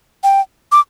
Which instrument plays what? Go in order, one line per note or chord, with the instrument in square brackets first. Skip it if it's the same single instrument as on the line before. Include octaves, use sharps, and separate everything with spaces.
[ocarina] G5
D6